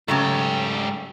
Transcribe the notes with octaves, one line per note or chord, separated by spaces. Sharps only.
G#2 C#3 F#3 A3 G4